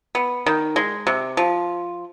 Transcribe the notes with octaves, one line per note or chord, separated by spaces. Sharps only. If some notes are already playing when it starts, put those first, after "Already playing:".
B3
D#3
G#3
C3
F3